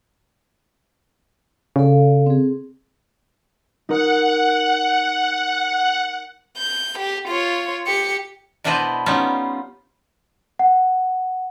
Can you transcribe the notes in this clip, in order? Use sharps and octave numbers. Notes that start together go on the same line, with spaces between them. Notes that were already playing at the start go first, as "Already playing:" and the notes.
C#3 A4 D5 F5
C4 G#4
D#4 A#4 F#5
G6
G4
F4 C#5
G4 C#7
B2 D4 E4 B4 C5 D#5
G3 B3 C#4 D#4 F4
F#5